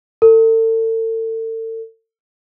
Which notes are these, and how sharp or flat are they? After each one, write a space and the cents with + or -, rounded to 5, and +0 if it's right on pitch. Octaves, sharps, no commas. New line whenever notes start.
A4 +35